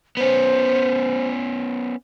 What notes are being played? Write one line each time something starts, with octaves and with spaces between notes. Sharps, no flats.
B3 C#4 C5